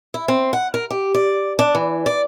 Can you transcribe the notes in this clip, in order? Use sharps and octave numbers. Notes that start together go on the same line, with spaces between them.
E4
C4
F#5
A#4
G4
D5
D4
E3
D5